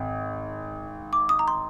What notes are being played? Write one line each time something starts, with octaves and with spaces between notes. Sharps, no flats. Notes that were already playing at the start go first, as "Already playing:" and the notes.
Already playing: G#1
D6
D#6
A#5
C6